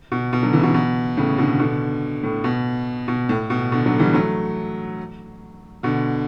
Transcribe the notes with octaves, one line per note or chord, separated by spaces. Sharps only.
B2
B2
D3 F#3
C#3 E3
B2 D3
B2
A2 C#3
B2 D3
B2 D3
A2
B2
B2
A2
B2
B2 D3
D3 F#3
E3 G3
F#3 A3
B2 D3